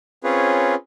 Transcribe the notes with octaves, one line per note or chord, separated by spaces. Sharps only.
C4 C#4 F4 G#4 B4 C#5